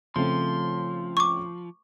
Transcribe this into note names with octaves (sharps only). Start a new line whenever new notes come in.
C#3 F3 A3 C4 C6
C#6 D6